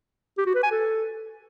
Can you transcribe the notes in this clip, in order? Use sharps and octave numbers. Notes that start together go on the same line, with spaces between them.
G4
F#4
B4
G#5
A4